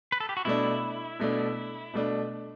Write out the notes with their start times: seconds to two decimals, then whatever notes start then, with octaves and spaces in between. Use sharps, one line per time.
0.12 B4
0.20 A4
0.29 G4
0.37 F#4
0.45 B2 A3 D4 E4
1.19 B2 A3 D4
1.94 B2 A3 D4